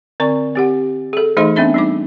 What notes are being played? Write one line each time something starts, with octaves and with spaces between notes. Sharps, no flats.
D3 C4 D5 C#6
C4 G4 F#5
G#4 A4
E3 A3 D#4 G#4 D#5 C6
B3 C4 D4 E5 B5
G3 D#4 D6